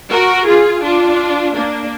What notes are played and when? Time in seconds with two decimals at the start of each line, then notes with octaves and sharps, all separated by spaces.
0.10 F#4 A#4
0.46 F4 G#4
0.83 D4 F4
1.54 A#3 D4